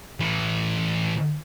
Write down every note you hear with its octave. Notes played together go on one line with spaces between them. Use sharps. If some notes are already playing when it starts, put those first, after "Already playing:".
A2 E3